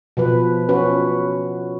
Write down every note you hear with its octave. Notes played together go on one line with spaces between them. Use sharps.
B2 F3 B4
C#4 F#4 B4